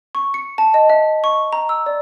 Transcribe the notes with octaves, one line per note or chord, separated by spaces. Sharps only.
C#6
C#7
A5
D#5
E5
C#6
A#5
E6
D5